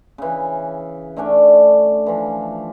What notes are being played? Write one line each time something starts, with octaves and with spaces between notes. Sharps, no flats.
C#3 E3
D3 A3 C#4 D4
E3 F3